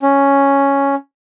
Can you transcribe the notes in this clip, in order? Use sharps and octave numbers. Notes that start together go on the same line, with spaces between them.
C#4